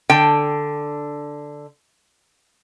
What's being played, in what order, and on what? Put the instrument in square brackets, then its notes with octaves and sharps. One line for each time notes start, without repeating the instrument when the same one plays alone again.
[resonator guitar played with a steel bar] D3 G5